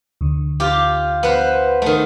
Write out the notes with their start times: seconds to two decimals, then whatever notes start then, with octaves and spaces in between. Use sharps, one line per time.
0.21 D2 D3
0.60 F4 G4
1.23 B3 B4 C5
1.82 D#3 A3